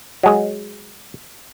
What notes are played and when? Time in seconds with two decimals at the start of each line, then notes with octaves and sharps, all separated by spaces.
0.23 F#3 G#3